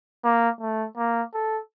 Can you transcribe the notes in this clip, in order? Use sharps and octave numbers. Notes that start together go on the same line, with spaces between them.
A#3
A3
A#3
A4